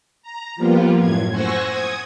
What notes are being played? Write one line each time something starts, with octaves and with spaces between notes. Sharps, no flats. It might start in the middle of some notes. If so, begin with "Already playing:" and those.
A#5
F3 G3 A#3 B3 F4
F#2 A2 G#6
C5 F#5 G#5 C#6 E6 A#6
D#6 G#6